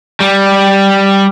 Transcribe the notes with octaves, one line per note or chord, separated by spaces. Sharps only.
G3